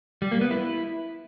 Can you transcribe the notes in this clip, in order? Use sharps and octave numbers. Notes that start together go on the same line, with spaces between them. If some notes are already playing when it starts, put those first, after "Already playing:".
G3
A#3
B3
E4